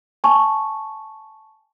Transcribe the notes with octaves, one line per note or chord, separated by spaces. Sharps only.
G#5 A5 C#6